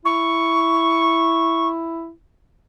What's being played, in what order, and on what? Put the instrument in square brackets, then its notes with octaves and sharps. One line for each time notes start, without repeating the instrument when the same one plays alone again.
[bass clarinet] E4 [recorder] C#6